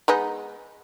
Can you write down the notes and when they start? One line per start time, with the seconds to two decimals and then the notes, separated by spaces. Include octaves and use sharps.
0.08 G#3 B3 D#4